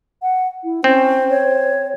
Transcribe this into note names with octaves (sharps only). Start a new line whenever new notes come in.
F#5
E4
C4 C#4 C5
C#5